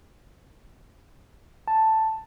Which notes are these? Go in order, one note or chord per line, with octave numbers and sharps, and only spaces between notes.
A5